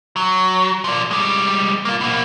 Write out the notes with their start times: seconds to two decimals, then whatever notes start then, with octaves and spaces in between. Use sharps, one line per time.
0.16 F#3
0.84 F3 D5
1.11 G3 G#3
1.85 A#3 F4
2.01 B2 A#3